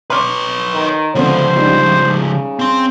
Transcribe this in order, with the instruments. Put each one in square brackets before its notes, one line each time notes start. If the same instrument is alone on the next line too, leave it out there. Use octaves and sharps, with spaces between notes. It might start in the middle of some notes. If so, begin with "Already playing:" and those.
[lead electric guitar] B4 C#5 [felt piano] C6 D6 F6
[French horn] D#3
[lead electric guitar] C#2 F3 [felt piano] D3 B3 [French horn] C5
[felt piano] G3 D4 D#4
[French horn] C#3
[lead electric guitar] C4 C6